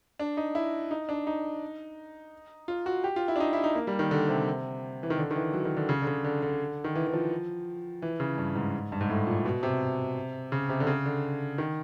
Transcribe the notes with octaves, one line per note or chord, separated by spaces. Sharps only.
D4
D#4
E4
D#4
D4
D#4
F4
F#4
G4
F4
E4
D4
D#4
E4
D#4
A#3
G3
D#3
D3
C3
E3
D#3
D3
D#3
E3
F#3
D#3
D3
C#3
D3
C#3
D3
D3
D#3
E3
E3
F3
E3
C#3
G2
G#2
G2
G#2
A2
A#2
B2
C3
C#3
C3
D3
C#3
D3
D#3